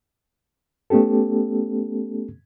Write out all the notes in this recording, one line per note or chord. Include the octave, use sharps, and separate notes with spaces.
A3 B3 C#4 G4 A4